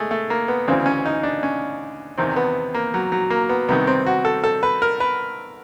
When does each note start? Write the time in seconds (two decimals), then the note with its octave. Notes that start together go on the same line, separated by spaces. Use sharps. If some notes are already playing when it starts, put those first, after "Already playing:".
Already playing: G#3 A3
0.11 A3
0.30 A#3
0.48 B3
0.68 D2 C#3 E3 C4
0.86 C#4
1.05 D#4
1.23 D4
1.43 C#4
2.18 E2 C3 D#3 C4
2.36 B3
2.74 A#3
2.94 F#3
3.12 F#3
3.30 A#3
3.49 B3
3.68 C2 C3 D#3 B3
3.87 C4
4.06 F#4
4.25 A4
4.44 A4
4.63 B4
4.82 A#4
5.00 B4